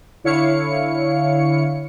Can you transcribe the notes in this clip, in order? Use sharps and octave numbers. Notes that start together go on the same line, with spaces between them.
D3 E4 C#5 F5 C#7